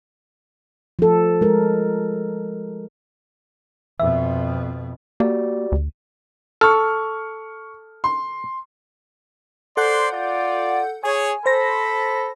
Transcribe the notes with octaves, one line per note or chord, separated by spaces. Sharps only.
F3 A4
G#3 A#4
F2 B2 E5
A#3 F#4 G4 D5
D2
A4 C#6 F6
C6
A4 C5 D5 F#5 C6 G6
F4 D5
G#4 C#5 G#5
A4 C5 B5 A#6